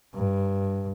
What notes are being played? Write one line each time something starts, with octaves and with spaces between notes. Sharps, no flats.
G2